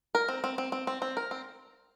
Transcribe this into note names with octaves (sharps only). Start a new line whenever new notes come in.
A#4
C4
C4
C4
C4
C4
C4
A#4
C4